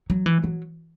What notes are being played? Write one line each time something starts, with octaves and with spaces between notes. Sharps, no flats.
F#3
E3
F#3